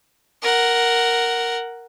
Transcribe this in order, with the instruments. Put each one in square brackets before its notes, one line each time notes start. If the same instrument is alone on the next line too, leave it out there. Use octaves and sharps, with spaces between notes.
[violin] A#4 F#5